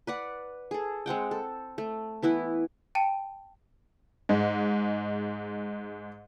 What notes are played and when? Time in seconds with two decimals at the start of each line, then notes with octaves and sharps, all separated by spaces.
0.07 B4 D5 F#5
0.71 G#4 A4
1.06 G#3 C4 F#5 G5
1.31 A4
1.78 A3
2.22 E3 B3 E4 B4
2.95 G5 A5 C#7 D#7
4.29 G#2 G#3